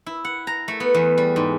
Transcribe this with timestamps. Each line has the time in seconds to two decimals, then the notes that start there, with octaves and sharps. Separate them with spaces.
0.06 E4
0.25 F#5
0.47 A#5
0.68 A3
0.80 B3
0.94 E2
1.18 G3
1.36 G#2